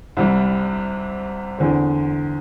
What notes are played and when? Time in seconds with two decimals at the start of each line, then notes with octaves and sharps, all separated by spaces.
0.17 C2 C3 G3
1.58 E2 D3 C4